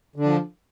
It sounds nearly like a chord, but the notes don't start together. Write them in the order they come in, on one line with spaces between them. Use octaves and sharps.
D3 D4 F3